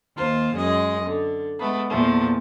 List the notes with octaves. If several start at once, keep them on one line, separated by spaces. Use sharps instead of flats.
D#2 F4 C5
F#2 G#3 D#5
D3
G#3 A3 B3
E2 A#2 F3 A3